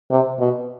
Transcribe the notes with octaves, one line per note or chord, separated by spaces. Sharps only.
C3
B2